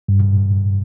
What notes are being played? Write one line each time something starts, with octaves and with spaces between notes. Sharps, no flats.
G2